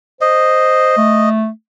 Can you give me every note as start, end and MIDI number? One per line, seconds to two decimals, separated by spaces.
0.21 0.95 72
0.21 1.29 75
0.97 1.49 57